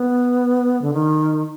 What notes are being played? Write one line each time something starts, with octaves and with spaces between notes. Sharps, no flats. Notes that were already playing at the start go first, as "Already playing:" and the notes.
Already playing: B3
D3
D#3